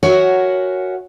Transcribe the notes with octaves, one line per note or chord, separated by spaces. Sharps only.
F#4 A#4 C#5 E5 F#5 G#5